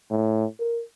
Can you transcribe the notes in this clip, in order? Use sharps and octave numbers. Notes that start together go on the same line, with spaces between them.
A2
A#4